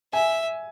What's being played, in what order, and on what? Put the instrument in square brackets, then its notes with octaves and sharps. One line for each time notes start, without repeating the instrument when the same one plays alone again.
[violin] E5 [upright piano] G#5